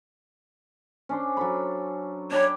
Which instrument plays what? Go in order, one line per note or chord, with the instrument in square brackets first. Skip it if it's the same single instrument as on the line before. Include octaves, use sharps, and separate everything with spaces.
[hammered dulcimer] C#4 D4 C5
F#3 A4 B5
[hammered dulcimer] D4 G5 B5 [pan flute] C#5